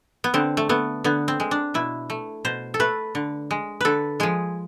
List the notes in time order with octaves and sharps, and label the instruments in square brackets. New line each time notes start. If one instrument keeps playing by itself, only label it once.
[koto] B3
D3 C4
A3
A3 B3
D3 B3
C4
G#3
D4
B2 E4
A3
B2 C5
A4
A3 B4
D3
G#3
D3 A4 B4
F3 G#3 G#4